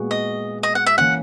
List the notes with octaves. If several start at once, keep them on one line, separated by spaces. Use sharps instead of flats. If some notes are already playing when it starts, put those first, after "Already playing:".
Already playing: A#2 G#3 B3 F#4
D#5
D#5
F#5
E5
E3 A#3 C#4 F#5